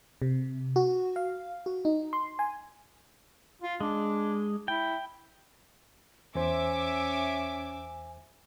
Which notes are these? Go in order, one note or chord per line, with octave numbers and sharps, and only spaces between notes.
C3
F#4
F5
F#4
D#4
C6
G#5
F4
G#3 D4
E4 G5
E2 C#4 C5 E5 G#5 D6